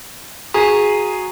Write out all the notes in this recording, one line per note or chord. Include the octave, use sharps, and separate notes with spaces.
F#4 G#4 G#5 A#5